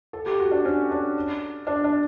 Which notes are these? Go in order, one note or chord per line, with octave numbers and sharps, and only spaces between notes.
A4
G4
F#4
D4
C#4
D4
D4
D4